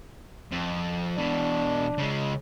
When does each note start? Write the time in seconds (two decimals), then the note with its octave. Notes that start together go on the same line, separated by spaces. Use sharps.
0.52 F2
1.18 B2 E3 D4
1.98 C#3 G#3